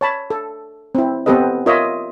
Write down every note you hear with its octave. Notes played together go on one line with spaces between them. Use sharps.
C#5 A5 B5
A4
C4 E4
B3 C4 G4 A4 B4 D#5
F4 A#4 C#5 D#5 E5